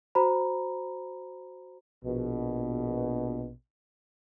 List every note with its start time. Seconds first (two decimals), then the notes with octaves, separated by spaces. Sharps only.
0.15 F#4 C5 A#5 B5
2.04 A#1 B2